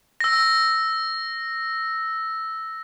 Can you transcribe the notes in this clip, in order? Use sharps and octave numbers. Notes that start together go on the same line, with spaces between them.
E6 A#6